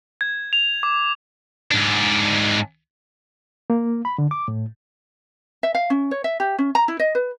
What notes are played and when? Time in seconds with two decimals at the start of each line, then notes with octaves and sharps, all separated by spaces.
0.21 G#6
0.53 F7
0.83 D6
1.71 G#2 D4
3.70 A#3
4.05 B5
4.18 D3
4.31 D6
4.48 A2
5.63 E5
5.75 F5
5.90 C#4
6.11 C#5
6.24 E5
6.40 G4
6.59 C#4
6.75 A#5
6.88 E4
6.99 D#5
7.15 B4